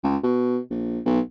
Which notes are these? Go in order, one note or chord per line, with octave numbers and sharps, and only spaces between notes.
C#2
B2
A#1
B1